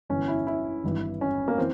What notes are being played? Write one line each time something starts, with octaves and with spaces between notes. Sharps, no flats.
G1 G2 E3 C#4
E4
E4
G#1 G2 E3
C#4
A#3
E3 C4